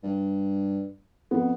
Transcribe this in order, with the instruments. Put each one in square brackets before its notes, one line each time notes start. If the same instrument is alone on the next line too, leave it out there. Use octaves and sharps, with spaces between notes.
[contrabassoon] G2
[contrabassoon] F2 [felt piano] B3